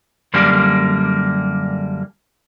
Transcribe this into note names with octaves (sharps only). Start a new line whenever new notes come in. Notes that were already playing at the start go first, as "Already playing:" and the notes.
F#2 D3 G3 A#3